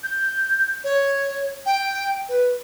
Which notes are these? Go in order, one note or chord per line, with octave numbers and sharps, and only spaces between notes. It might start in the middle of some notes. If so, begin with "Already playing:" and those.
G6
C#5
G5
B4